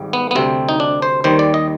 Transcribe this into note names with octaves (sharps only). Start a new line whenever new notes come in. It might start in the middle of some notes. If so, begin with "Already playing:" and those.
Already playing: G#1 G#2 G3
B3
B3
D2 C3 G3 C4
D#4
D4
C5
D#2 D#3 G3 C5
D5
D#5